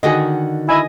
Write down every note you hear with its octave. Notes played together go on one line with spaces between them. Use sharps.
D3 D#3 F#4 G#4 D#5
E4 D#5 G#5